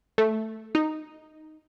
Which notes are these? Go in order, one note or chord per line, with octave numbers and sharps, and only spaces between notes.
A3
D#4